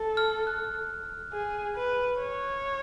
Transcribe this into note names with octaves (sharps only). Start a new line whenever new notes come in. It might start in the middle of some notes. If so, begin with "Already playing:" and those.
Already playing: A4
F6
F#6
G#4
B4
C#5